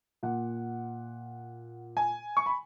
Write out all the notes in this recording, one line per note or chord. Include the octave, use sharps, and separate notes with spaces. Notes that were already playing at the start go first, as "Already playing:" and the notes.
A#2 F#5
G#5
C#6
B5